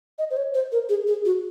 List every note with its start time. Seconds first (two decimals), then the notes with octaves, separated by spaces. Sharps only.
0.18 D#5
0.30 C5
0.37 C#5
0.54 C5
0.72 A#4
0.89 G#4
1.07 G#4
1.25 F#4